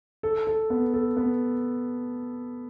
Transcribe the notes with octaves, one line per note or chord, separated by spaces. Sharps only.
A4
A4
B3
A4
B3